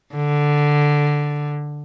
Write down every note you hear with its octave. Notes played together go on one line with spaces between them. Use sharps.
D3